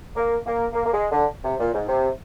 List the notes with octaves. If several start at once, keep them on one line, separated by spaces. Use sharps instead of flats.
A#3
A#3
A#3
A#3
G#3
D3
C3
A#2
G#2
C3